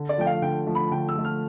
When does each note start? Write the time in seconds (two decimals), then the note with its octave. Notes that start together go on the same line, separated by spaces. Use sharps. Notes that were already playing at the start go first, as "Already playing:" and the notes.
Already playing: D3
0.09 D5
0.18 F3 A3 G5
0.26 F5
0.42 D3 G5
0.67 F3 A3
0.75 B5
0.91 D3 G5
1.09 E6
1.16 F3 A3
1.24 F6